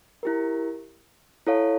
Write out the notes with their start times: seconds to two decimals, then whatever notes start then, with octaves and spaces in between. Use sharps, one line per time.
0.23 E4 G4 A#4
1.46 E4 A4 C#5 F5